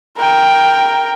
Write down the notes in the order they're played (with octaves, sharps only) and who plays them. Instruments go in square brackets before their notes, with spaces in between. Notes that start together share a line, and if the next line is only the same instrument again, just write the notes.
[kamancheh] A#4 G5